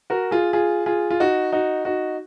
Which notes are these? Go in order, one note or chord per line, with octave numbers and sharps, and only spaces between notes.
F#4 A#4
F4 G#4
F4 G#4
F4 G#4
F4
D#4 F#4
D#4 F#4
D#4 F#4